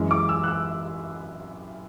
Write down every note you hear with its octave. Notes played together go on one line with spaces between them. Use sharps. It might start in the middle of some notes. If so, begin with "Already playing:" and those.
Already playing: F#2 E3 G#3
D6
E6
F#6
E6